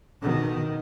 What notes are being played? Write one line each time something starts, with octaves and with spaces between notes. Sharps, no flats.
B2 D#3